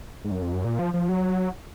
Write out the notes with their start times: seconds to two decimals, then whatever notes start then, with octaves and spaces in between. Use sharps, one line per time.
0.24 G#2
0.31 F#2
0.42 F2
0.53 F#2
0.64 A#2
0.79 F3
0.94 F3
1.09 F#3